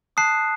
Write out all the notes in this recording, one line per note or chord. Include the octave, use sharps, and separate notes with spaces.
A5 D#6 F#6 C7